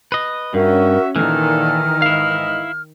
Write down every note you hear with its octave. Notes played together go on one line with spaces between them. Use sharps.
B4 D#5
G2 C#4 F#4 A#4 E5
A#2 D#3 E3 A4 F6
G#2 E3 E4 D#5 F5